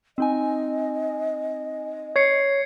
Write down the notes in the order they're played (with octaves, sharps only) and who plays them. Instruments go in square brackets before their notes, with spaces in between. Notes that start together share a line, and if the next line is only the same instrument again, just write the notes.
[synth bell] C4 D#4 G#5 [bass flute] D#5
[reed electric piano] C#5 [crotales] G#6 C7 C#7